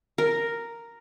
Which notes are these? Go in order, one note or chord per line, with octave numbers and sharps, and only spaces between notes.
A#4